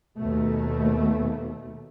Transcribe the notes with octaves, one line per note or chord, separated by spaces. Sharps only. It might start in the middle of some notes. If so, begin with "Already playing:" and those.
D#2 B2 A3